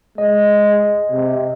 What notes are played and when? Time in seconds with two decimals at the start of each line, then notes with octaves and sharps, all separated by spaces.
0.18 G#3 D#5
1.12 C3